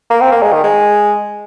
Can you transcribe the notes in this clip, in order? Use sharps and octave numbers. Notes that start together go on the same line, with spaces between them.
A#3
C4
A#3
G#3
D#3
G#3